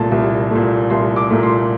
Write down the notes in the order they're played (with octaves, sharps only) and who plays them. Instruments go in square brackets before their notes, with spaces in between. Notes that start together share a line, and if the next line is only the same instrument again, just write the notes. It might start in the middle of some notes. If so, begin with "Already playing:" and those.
Already playing: [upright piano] C2 A#2 A3 A5
C2
A#2 A3
C2 C6
D6
A#2 A3
C6